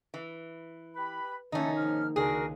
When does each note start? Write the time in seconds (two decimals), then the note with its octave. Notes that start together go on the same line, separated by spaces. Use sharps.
0.14 E3
0.96 G4 B4 B5
1.52 D#3 A3 A#3 C#4 D#4 E4 A4
1.76 G#2 F3 F6
2.16 C#2 D4 F#4 G#4 A#4